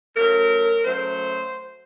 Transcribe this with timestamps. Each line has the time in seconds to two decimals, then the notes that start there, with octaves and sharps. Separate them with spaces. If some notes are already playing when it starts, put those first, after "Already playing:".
0.16 F#2 F#3 A3 A#4
0.84 F#2 F#3 A3 C5